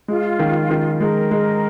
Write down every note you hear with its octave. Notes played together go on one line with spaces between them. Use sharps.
G#3 F4
D#3
D#3
G#3 A#4
G#3